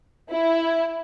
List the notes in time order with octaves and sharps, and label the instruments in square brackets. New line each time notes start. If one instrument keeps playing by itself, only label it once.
[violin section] E4